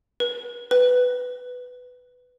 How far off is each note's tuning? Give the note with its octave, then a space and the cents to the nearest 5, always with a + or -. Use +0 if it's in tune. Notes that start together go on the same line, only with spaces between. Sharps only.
B4 -40
B4 +10